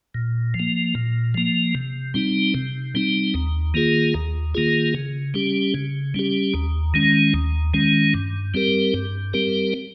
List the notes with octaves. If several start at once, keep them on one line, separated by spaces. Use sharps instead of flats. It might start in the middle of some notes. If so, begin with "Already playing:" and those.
A#2
F3
A#3
A#2
F3 A#3
C3
G3 C4 D#4
C3
G3 C4 D#4
D#2
D#3 A#3 F4 G#4
D#2
D#3 A#3 F4 G#4
C#3
G3 C#4 G4
C#3
G3 C#4 G4
D#2
D#3 G#3 C#4
D#2
D#3 G#3 C#4
G2
G3 C4 G4 A#4
G2
G3 C4 G4 A#4